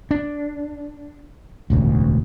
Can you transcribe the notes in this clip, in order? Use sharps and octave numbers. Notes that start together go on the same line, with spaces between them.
D4
E1 A1 D2